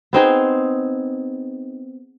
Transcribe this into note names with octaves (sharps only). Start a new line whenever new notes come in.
B3 C4 D#4 G#4